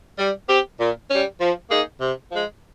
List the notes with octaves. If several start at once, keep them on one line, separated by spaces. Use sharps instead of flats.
G3
C4 G4
A#2
G3 C#4
F3
A#3 D#4 G#4
C3
F3 G#3